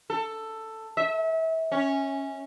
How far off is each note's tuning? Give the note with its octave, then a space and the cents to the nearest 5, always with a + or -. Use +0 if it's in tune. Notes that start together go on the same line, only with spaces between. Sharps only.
A4 +10
E5 -30
C#4 -10